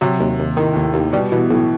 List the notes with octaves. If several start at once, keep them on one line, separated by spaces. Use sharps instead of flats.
C3 F#3
D#2
D#2
A2 D#3
D#2 A2
D#2
B2 G3
B2 E3
B1 A2